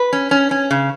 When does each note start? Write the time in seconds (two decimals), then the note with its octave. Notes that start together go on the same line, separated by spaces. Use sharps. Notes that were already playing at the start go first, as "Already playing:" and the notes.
Already playing: B4
0.13 C#4
0.31 C#4
0.51 C#4
0.71 C#3